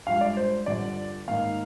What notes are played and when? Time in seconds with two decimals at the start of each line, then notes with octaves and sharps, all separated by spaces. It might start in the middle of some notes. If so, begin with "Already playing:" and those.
0.06 G2 F3 G#3 F5
0.21 D5
0.37 C5
0.66 G2 D3 F3 D5
1.28 G#2 D#3 A#3 D#4 F5